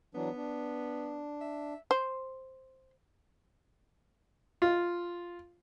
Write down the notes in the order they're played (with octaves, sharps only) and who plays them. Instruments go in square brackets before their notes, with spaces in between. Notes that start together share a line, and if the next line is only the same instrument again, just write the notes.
[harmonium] E3 F#3 D4 [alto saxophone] B3
[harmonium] D4
[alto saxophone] E5
[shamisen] C5
[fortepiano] F4